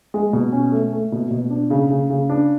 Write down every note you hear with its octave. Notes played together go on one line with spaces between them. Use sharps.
G#3
B2
C#4
A3
A3
B2
B2
D4
C#3
C#3
C#3
D4